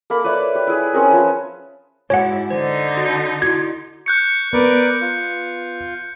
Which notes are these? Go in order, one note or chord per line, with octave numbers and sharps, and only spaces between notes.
A#3 A4 B5
B4 C#5 D5 E5
G4
E4 G#4
C4 C#4 G#4 A#4
F3 B4 A5
G#2 E4 F#4 C#5 F#5 G#5
D3 D#4 C5
F#4
E4 F#4 G#6
C#6 F#6 G6 C#7
B3 A#4 B4 D5
F4